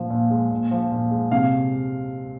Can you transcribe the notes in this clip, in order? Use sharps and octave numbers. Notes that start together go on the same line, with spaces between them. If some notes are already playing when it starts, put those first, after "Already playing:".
Already playing: A#2 F3
A#2
G#3
A#2
F3
A#2
G#3
C3 F5